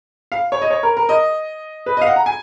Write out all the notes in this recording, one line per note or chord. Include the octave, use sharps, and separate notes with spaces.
F5
C#5
D#5
C#5
A#4
A#4
D#5
B4
D#5 F5
F#5
A#5
G#5